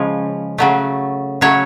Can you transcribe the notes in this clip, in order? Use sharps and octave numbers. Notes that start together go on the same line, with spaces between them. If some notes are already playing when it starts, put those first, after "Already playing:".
Already playing: C#3 F3 G#3
C#3 F#3 A3
C#3 F#3 A3 C#5